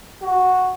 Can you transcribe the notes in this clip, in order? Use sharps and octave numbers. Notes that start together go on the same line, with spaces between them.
F#4